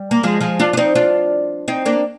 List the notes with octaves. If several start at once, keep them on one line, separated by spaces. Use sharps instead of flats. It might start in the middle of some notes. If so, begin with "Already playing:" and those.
Already playing: G3
A#3
F3 G#3
F3 G#3
D4 F4
D4
C4 D#4
D4 F4
C4 D#4
A#3 D4